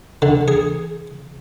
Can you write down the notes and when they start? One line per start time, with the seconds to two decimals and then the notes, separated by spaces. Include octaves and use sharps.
0.22 D3
0.48 G#4